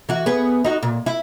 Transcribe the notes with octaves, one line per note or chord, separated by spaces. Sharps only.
E3 F#4
B3 G#4 B4
D#4 F#4
A#2
E4